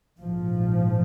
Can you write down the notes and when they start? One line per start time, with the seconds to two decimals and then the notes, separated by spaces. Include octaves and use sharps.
0.20 A#1 G#2 F3